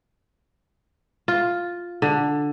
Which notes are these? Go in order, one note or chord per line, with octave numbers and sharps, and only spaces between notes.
F4
D3